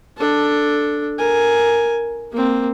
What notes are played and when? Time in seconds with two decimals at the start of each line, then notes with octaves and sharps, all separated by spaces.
0.17 D4 A4
1.19 A#4 G#5
2.32 A#3 C4